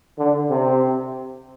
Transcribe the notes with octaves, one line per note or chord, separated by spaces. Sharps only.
D3
C3